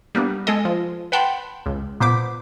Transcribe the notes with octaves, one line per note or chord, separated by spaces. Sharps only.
G3 A#3 B3 D4
G#3 A4 D#5
F3
B4 F#5 G5 A5 B5 C6
C#2
A#2 B3 C5 D6 B6